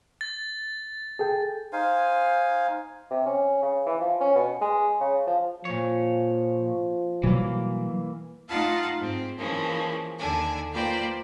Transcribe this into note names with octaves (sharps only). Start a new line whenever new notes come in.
A6
G#4 A4 G5
D#4 C5 F5 G#5
C3
C#4
C#3
E3
F3
C#4
B2
G#3
C#3
F3
A#2 F3 C#5
B2 E3 F#3 G3 A#3
A3 D#4 F4 F5 F#5 A5
G#2 C4
E3 F3 G#3 A#3 C#4
D#2 D3 D4 G#5
A#3 F4 B4 C5 D5 G5